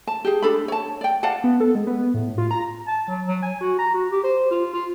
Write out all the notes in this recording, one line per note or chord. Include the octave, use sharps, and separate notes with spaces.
A5
G4 G#4
D4 A4 B5
C#5 A5
D5 G5
D5 F5 F#5 A5
B3
A4
G#3
B3
A2
F4
A#5
A5
F#3
F#3
G#5
F#4
A#5
F#4
G4
C5
F4
F4